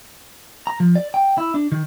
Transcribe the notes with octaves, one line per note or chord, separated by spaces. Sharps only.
A#5
F3
D5
G5
E4
D4
D#3